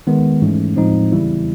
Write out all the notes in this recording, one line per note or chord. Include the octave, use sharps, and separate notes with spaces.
D#3 G#3 B3
G#2 E3 A3 C#4
A2 F3 G#3 C4 D#4
C#3 E3 G3 B3 E4